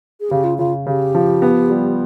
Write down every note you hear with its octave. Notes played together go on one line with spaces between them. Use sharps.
G#4
C#3 G4
F4
C#3 F4
C#3 G4
F3
B3
G3